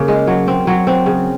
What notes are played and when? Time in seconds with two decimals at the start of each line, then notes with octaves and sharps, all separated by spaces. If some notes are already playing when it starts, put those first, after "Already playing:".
Already playing: C#3 A#3
0.08 G#3
0.27 F#3
0.47 C4
0.67 F#3
0.87 C4
1.06 C#3